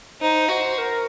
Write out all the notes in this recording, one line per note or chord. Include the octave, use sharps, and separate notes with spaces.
D#4 C5
F#4 C5
A#4